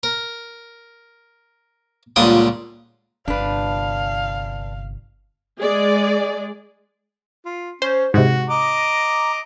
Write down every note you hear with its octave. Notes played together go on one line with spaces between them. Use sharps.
A#4
C#2 A#2 D3 G3 D5 D#6
G1 C3 D4 B4 F5
G#3 G#4 D5
F4
C#4 C5
G#2 C3 F#4
D#5 A#5 D6